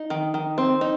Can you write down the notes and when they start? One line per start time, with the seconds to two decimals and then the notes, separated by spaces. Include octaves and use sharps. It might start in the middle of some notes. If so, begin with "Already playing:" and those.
Already playing: D#4
0.10 D#3
0.34 D#3
0.58 C4
0.81 D#4